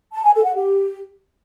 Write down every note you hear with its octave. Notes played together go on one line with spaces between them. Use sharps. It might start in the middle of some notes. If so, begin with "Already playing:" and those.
A5
G#5
A4
F#5
G4